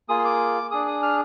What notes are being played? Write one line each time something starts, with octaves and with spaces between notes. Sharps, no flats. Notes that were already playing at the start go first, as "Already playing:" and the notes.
A#3 F4 G#4 D#6
C6
D6
D4 G#4 D#6
D#6
F6